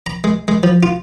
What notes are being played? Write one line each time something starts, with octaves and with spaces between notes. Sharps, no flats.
A#5
G#3
G#3
F3
F4